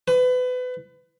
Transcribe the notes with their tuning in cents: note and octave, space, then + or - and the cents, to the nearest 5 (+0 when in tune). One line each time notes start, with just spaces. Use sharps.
B4 +30